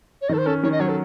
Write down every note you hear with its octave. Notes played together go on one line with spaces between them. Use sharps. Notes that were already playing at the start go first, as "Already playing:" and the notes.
C#5
D#3 A4 D#5
C5
C#4 A4
D#3 C#5
D#5
F#3 C#5
A4